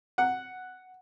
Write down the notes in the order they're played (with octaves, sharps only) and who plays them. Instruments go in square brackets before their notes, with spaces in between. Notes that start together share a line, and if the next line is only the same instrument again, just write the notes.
[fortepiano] F#5